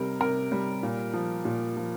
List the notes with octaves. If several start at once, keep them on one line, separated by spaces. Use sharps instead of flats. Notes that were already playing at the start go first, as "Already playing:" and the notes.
Already playing: C3 G3 A#4
C3 A#4
G3
A#2
F3
A#2
F3